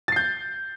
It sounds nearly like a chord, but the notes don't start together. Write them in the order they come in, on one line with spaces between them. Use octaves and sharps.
A6 C7 G6